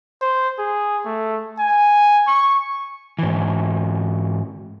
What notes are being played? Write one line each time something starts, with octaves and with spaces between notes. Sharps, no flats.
C5
G#4
A3
G#5
C#6
G#2 E3